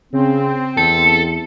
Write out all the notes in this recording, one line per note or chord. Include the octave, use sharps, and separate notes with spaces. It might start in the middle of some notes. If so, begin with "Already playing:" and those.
C#3 C4
E2 A4